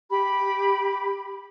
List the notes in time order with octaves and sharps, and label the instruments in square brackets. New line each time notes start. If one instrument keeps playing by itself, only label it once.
[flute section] G4 B5